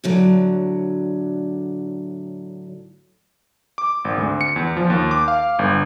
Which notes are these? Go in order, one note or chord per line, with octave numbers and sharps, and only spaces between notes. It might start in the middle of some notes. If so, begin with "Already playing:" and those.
A2 D3 F#3
D6
G#1
D2
C#7
E2
F3
D#2
D6
F5
G1